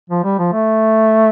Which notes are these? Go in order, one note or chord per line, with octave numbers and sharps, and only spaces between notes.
F3
G3
F3
A3